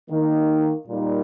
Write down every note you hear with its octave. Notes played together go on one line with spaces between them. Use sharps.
D#3 A#3 D#4
A#2 G3 A#3 D#4